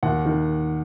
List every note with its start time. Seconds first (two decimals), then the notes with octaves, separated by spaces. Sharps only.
0.03 D#2 F#5
0.26 D#3